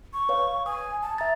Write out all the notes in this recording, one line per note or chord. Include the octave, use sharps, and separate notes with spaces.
C#6
B4 C#5 F5
G#5 D#6
A5
E5 A#5 A6